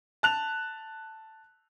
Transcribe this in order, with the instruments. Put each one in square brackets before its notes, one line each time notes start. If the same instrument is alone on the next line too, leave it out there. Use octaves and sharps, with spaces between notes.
[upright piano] A5 F#6 F7